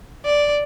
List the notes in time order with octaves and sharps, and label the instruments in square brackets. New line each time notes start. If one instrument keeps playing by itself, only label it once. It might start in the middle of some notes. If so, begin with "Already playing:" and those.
[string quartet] D5